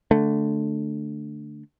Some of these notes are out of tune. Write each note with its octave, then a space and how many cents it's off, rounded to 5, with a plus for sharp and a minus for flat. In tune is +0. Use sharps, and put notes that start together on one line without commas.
D3 +0 A3 +0